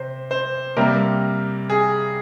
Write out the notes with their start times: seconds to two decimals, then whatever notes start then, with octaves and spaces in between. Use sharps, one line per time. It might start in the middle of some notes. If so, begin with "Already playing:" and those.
Already playing: C3 C5
0.31 C5
0.77 C3 G3 A#3 A#4
1.70 G#4